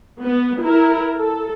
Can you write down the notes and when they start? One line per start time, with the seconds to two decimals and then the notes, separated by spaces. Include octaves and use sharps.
0.20 B3
0.61 E4 A#4
1.17 A4